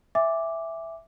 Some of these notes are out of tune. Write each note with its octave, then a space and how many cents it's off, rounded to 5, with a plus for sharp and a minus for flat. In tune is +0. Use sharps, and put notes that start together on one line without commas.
E5 +0 G#5 -30 D6 +0